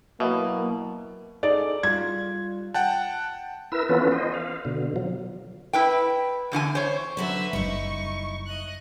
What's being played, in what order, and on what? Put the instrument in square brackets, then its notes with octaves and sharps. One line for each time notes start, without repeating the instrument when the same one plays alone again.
[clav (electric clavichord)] B2 [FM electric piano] F#3 E4 [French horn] A#3
[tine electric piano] D#4 G#4 A4 [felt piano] D5
[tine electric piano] G3 F4 [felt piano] G#6
[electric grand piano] F#5 G5 A5 [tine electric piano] F#6
[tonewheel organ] E4 A#4 B4 E6
E3 B3 C#4 F4 A4 B4
C5 D#5
F5
B2 D3
F3 F#3
[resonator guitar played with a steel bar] E4 B4 G5
E2 D3 F4 G#5
C5 C#5
[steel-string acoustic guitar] D3 F#3 C5 [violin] B4 E5
[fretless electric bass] F#1 C#2 G3 [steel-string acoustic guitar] D#4 E4 [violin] C#6
[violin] D#5 F#6